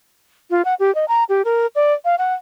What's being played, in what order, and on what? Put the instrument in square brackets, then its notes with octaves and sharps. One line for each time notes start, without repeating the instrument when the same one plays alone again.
[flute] F4
F#5
G4
D#5
A#5
G4
A#4
D5
F5
F#5